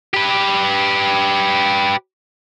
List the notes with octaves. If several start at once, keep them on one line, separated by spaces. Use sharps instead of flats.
G4 B4